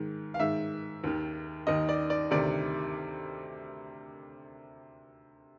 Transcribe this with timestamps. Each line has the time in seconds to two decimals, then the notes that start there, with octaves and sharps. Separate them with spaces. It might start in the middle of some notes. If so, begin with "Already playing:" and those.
Already playing: G#2 D#3
0.34 F5
0.40 G#2 D#3 E5
1.04 D#2 D#3
1.67 D#2 D#3 D#5
1.89 D5
2.10 D5
2.31 D2 C3 D#3 D5